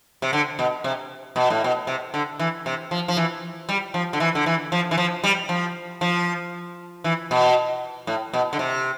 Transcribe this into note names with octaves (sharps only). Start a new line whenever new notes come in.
C3
D3
B2
C3
B2
A2
B2
C3
D3
E3
C3
F3
F3
E3
G3
F3
D3
E3
D3
E3
F3
E3
F3
G3
F3
F3
E3
B2
A2
B2
D3
C3